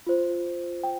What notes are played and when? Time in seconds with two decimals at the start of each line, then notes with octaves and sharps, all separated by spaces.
0.07 F4 C5
0.83 G5